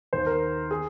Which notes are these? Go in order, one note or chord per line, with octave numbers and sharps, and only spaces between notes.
D#2 D#3 C5
A#4
G#4